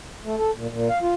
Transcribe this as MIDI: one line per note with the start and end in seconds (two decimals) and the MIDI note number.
0.25 0.35 57
0.38 0.51 69
0.56 0.67 46
0.71 0.88 46
0.89 0.99 77
1.02 1.14 65